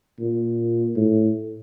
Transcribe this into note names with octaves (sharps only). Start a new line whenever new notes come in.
A#2
A2